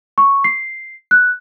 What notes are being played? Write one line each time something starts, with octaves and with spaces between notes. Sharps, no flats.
C#6
C7
F#6